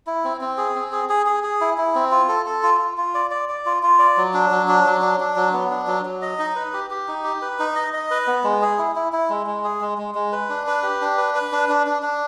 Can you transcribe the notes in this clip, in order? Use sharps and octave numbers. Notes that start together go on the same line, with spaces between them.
E4
C4
C4
G#4
C4
G#4
G#4
G#4
G#4
E4
E4
C4
F4
A4
A4
F4
F4
F4
D5
D5
D5
F4
F4
D5
F#3
D4
F#3
D4
F#3
D4
D4
F#3
B3
D4
F#3
F#3
D#5
D#4
B4
G4
G4
D#4
G4
B4
D#4
D#5
D#5
B4
B3
G#3
G#4
E4
E4
E4
G#3
G#3
G#4
G#3
G#3
G#3
B4
D4
B4
G4
D4
B4
B4
D4
D4
D4
D4